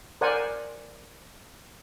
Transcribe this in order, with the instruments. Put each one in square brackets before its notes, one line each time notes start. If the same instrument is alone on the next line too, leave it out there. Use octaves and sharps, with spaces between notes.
[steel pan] A#4 C5 D5 F#5 G#5